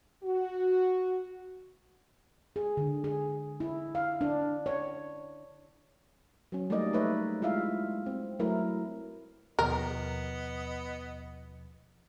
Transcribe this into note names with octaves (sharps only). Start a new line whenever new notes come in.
F#4
G#4
D3
G#4
E4
F5
D4
C#5
F#3 C#4
G3 A3 A#3 D#4 D5 D#5
A3 D#4 B4 C#5 E5
G#3 E4 F4 E5 F5
C4
F#3 A3 E4 A#4 B4
D#2 B2 F3 B3 A#4 D#5